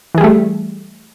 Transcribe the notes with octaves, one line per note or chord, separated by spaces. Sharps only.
E3 G3 A3 G#4